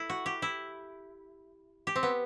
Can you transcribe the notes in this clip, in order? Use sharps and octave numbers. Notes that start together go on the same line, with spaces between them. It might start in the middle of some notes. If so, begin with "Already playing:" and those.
Already playing: E4 A4
F#4
G4
E4
G4
C4
B3